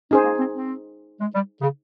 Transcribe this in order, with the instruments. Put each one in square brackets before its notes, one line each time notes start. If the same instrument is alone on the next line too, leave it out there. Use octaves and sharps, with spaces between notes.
[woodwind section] C#4 [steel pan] D#4 G#4 C5
[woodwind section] A#3
C4
C4
G#3
G3
C#3